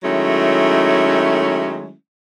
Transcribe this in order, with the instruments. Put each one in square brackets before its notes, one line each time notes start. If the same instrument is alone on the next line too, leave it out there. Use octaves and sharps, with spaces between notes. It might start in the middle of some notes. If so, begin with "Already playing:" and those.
[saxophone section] D#3 F#3 G#3 A3 C#4 E4